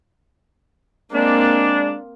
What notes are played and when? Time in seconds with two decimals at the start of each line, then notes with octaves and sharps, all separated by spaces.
1.12 G#3 A#3 C4 D4